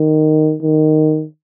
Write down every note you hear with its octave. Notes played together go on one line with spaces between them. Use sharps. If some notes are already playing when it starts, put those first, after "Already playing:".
Already playing: D#3
D#3